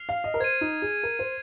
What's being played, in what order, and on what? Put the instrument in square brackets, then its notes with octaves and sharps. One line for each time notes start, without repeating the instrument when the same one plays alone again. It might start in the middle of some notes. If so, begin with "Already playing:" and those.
Already playing: [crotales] F6 C7 F7
[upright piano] F5
D#5
A#4
[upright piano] C5 [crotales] G#6 D#7
[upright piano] D#4
G#4
A#4
C5